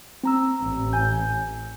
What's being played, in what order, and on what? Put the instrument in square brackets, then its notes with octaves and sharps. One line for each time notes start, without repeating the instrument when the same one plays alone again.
[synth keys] C4 A#5 E6
[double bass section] A1
[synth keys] G#5 G6